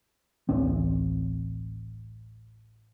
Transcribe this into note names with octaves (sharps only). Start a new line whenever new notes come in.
D1 A1 C4